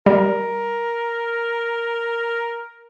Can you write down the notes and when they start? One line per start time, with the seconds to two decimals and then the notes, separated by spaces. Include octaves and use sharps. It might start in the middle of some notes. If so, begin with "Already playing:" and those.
0.06 G3 A#4